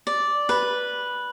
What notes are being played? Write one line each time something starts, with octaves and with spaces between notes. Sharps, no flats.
D5
B4